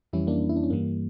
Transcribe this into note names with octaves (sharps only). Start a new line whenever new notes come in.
F2 E3 G3 C#4 E4
A#3 D4
E4
D4
C#4
G2 E3 G3 A#3